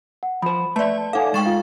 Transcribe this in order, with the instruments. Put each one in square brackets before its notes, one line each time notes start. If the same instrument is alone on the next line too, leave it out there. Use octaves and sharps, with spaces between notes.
[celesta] F#5
[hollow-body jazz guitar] F3 C5 [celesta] B5
[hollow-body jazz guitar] A3 E5 [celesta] B4 [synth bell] D5 A5
[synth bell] D#4 F5 [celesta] A4 F#5 G#5
[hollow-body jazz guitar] G#3 [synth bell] G5 C#6 A6 [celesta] E7
[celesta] F4 F5